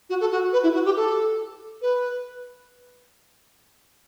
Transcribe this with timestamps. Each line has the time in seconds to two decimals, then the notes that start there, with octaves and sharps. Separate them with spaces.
0.10 F#4
0.20 A4
0.31 F#4
0.53 B4
0.63 E4
0.74 F#4
0.85 G4
0.96 A4
1.82 B4